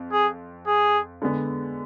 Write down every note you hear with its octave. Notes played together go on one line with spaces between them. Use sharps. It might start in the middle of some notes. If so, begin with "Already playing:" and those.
Already playing: F2
G#4
G#4
D3 G#3 B3